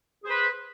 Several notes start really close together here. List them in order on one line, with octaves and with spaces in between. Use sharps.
G#4 C5 B4